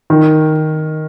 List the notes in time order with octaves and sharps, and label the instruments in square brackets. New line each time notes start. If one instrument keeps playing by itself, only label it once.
[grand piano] D#3